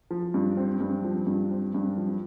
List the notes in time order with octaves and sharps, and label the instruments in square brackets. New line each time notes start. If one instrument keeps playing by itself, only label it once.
[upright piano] F3
G2
C4
G2
F3
G2
C4
G2
F3